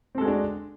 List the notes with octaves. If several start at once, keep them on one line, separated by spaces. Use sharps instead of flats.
G#3 C4 D4 F#4 A4